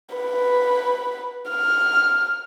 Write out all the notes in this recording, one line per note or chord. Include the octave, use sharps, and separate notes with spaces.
B4
F6